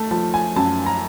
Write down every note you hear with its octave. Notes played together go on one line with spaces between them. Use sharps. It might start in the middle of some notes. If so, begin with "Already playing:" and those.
Already playing: A3 A5
F3 A5
G#5
F#2 A5
A#5